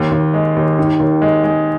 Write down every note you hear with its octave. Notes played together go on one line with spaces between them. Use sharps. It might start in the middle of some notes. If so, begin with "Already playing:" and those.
Already playing: D#2
D#2
G#3
D#2
D#3
D#2
G#3
G#3